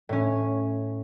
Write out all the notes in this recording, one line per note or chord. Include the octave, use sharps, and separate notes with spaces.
A2 C#4